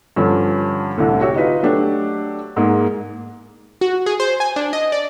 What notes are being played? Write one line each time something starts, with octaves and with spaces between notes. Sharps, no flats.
G2 D3 F3 C#4
C2 A2 D3
F#4 G4 C#5 E5
D#4 F4 B4 F5
F#3 A3 D4 G4
G#2 G#3 A#3 G#4
F#4
G#4
C5
G#5
D4
D#5
D5